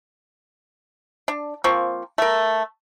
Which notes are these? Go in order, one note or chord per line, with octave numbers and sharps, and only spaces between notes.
D4
F3 A#3 C4 C#6
A3 A#4